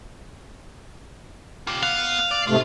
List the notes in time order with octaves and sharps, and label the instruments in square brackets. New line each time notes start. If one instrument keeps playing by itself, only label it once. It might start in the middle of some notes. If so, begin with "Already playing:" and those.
[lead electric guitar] F4 G4
[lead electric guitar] B3 [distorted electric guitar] F5
[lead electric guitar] D5
[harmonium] G#2 C3 A3 [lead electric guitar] F4